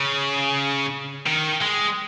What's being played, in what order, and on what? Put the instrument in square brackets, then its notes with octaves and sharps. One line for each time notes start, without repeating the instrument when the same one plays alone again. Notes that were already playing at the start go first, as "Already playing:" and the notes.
Already playing: [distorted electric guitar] C#3
D#3
G#3